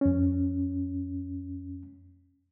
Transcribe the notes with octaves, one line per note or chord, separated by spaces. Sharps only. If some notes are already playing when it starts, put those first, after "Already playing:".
F2 C#4